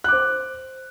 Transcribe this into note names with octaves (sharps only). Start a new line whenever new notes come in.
C5 D6 F#6